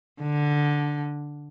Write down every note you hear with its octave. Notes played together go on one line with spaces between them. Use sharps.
D3